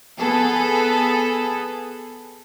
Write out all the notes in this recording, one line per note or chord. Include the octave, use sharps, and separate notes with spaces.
B3 G#4 A4